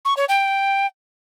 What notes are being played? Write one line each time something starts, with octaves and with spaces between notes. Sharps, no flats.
C#6
C#5
G5